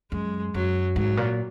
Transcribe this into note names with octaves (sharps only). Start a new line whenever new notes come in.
F#2 G#3
F#2 F#3
G#2 F#3
A#2